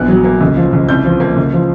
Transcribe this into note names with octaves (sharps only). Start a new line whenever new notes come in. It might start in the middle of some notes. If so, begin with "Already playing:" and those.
Already playing: A#1 B3 F#6
F#3
A#3
C#2
F3
C#2
C2 G6
F3
A#3
C#2
F3